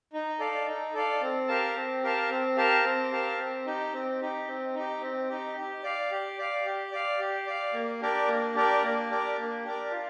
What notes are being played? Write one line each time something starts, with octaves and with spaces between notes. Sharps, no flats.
D#4
A4 D5 F5
D#4
A4 D5 F5
C4
G4 A#4 F5 A5
C4
G4 A#4 F5 A5
C4
G4 A#4 F5 A5
C4
G4 A#4 F5 A5
C4
D#4 G4
C4
D#4 G4
C4
D#4 G4
C4
D#4 G4
G4
D5 F5
G4
D5 F5
G4
D5 F5
G4
D5 F5
A#3
D4 G4 A#4 D5
A#3
D4 G4 A#4 D5
A#3
D4 G4 A#4 D5
A#3
D4 G4 A#4 D5
F4